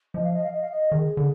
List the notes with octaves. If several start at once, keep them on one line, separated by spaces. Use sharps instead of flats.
F3 D#5
F5
D#5
F5
D#5
F5
D#5
D#3 G#4
D3